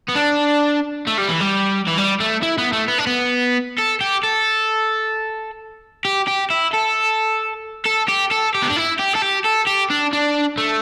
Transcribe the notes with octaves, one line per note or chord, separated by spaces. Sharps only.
B3
D4
A3
G3
E3
G3
E3
G3
A3
E4
B3
A3
B3
D4
B3
A4
G4
A4
G4
G4
E4
A4
A4
G4
A4
G4
B3
D4
E4
G4
A4
G4
A4
G4
D4
D4
A3